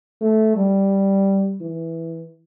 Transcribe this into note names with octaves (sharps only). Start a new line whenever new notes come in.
A3
G3
E3